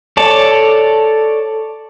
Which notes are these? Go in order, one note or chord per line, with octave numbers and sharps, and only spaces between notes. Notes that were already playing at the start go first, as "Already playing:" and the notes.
A4 C#5 D5 A5